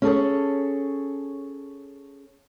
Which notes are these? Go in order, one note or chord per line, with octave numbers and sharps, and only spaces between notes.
C#4 G#4 A4 C#5